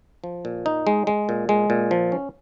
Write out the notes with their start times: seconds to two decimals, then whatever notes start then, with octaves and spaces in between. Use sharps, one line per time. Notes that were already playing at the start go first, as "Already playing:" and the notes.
0.24 F3
0.45 A#2
0.66 D#4
0.87 G#3
1.07 G#3
1.29 A#2
1.49 G#3
1.70 A#2
1.91 F3
2.12 C#4